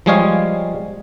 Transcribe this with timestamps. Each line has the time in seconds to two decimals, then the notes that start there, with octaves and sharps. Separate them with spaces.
0.06 F3 G3 G#3 G#4 C#5 F5